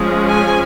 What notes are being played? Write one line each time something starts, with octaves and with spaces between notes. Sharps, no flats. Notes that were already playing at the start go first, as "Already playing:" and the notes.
Already playing: F3 G#3 C#4
G#5